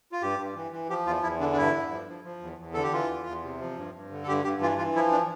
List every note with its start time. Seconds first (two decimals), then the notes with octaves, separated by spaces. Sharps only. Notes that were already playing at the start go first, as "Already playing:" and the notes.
0.12 F4
0.22 G2 G4
0.39 G2
0.56 E3
0.72 E3
0.89 F3 G4
1.06 E2 F4
1.23 E2 E4
1.40 D3 D4
1.52 D4
1.57 G2 E4
1.73 G2
1.91 F3
2.07 F3
2.24 F3
2.42 E2
2.58 E2
2.74 D3 A4
2.83 G4
2.93 E3 F4
3.10 E2
3.26 E2
3.43 C3
3.59 F3
3.77 G2
3.94 G2
4.10 D3
4.22 A4
4.28 G2 G4
4.44 G2 G4
4.61 E3 F4
4.78 E3 F4
4.95 F3 E4
5.12 D4